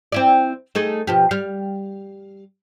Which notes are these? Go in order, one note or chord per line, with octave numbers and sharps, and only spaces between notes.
C4 E4 D5
A3 D#4 G#4
B2 F3 G4
G3 F5